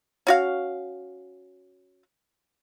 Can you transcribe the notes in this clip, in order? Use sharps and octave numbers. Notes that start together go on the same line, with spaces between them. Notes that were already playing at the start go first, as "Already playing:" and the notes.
C#4 F#4 F5